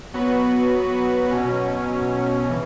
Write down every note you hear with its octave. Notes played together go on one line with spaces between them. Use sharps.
F#3 B3 F#4 B4
B2 F#3 C#4
C#3 E3